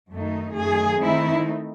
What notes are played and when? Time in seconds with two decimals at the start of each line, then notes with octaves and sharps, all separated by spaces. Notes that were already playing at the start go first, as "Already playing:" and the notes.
0.11 F#2 D#3 A3 D#4
0.56 F#2 D#3 A3 G#4
1.00 D#3 A3 C4 D#4 E4